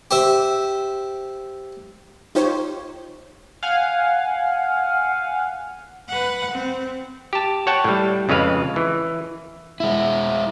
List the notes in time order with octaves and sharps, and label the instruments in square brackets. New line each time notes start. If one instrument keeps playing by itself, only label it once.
[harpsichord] G4 C5 E5
[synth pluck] D#4 F4 G4 C5 C#5
[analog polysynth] F5 F#5 G#5
[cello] B4 F#5
C4
[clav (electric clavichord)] G4 A5
C#5 F#5 G5 A5
A2 G3
F2 C#3 G#3 B4 F5
E3
[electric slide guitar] G#3 E4